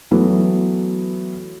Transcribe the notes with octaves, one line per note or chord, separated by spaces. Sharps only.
E3 F#3 A3 B3 E4